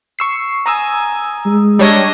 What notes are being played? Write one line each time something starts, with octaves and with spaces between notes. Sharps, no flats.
C#6 E6 C7
G#5 A#5 D#6 E6
G#3
G3 D4 C#5 D#5 G#6